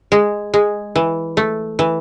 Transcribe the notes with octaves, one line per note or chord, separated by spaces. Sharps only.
G#3
G#3
E3
A3
E3